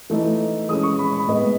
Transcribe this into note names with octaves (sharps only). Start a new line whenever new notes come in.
E3 A3 D#4
E3 G#3 C#4 D#6
C#6
B5
B5
A2 G#3 B3 D#5